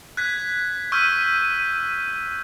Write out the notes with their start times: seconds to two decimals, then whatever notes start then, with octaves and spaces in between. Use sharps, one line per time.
0.17 F#6 G#6 B6
0.92 C#6 E6 F6 G6 B6 D#7